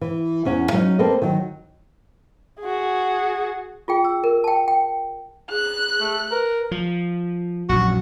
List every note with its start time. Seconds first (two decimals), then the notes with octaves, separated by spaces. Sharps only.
0.01 E3
0.45 E2 C#4 C#5 F#5
0.73 F#3 C#4 D#4
0.99 A#3 C4 A4 B4 D#5
1.22 D#3 F#3
2.60 F#4 G#4
3.88 F4 G#4 G5
4.04 E6
4.24 A#4
4.44 G5 A5
4.68 G5
5.51 G#4 F#6
6.00 A3
6.31 A#4 B4
6.71 F3
7.69 A#1 F#2 F#4